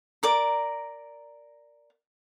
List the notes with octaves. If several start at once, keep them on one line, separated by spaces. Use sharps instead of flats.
A#4 D5 A#5